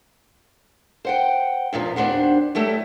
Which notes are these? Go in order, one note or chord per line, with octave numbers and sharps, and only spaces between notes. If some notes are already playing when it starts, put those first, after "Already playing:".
C5 F#5 G5
E2 A#2 C#3 F3
D#2 B3 D4 C5 F#5
F#3 G3 A3 E4